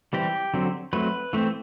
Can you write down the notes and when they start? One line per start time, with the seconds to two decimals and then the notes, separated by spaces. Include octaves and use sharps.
0.13 E3 G3 C4 G4
0.54 D3 F#3 C4
0.93 F#3 A3 C4 B4
1.33 E3 A3 C4